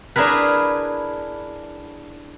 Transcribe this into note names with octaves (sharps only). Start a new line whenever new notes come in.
D4 E4 G#4 A#4 B4